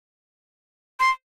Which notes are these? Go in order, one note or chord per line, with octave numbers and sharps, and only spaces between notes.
C6